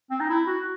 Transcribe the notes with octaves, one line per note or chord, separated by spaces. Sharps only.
C4
D#4
E4
F#4